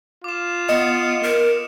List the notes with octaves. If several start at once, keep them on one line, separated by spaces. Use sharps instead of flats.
F4 D6 E7
B3 D#5 D#6 C#7 E7
A#4